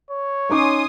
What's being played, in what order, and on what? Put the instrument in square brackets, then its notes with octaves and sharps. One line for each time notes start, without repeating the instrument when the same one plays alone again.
[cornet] C#5
[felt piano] C#4 D#4 D6 [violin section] G#5 C6 D#6